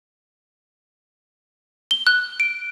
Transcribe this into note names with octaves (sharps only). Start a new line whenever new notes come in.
G7
F#6
D7